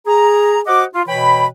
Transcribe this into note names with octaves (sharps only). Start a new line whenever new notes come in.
G#4 A#5
F#4 C5 D#5 F#5 D6
F4
B2 E3 C#5 G5 B5